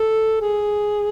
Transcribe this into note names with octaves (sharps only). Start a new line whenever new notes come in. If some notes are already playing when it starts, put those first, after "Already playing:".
Already playing: A4
G#4